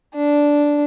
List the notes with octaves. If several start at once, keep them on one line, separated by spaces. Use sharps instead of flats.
D4